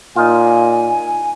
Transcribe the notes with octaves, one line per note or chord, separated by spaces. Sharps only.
A#2 D#4 F4 G#5